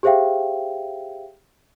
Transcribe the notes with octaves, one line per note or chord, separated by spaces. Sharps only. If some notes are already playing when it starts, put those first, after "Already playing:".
G4 G#4 C5 E5 F5 G5